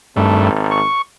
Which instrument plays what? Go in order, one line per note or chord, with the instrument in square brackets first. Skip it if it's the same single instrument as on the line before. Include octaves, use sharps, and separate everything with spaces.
[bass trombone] G#1 [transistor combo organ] G2 A3
[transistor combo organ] C#6